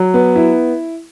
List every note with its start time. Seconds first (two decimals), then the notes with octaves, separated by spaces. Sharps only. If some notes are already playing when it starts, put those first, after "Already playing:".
Already playing: F#3
0.14 B3
0.36 E4